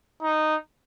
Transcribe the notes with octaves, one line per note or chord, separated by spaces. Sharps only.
D#4